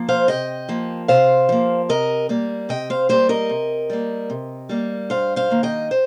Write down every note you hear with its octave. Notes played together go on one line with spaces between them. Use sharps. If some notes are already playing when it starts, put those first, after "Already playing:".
Already playing: F3 A#3
C5 F5
C3 D#5 G5
F3 A#3
C3 C5 F5
F3 A#3
C3 A#4 D#5
G3 A#3
C3 D#5 G5
C5 F5
G3 A#3 G4 C5
A#4 D#5
C3
G3 A#3
C3
G3 A#3
G2 C5 F5
C5 F5
D#3 A#3
D#5 G5
C5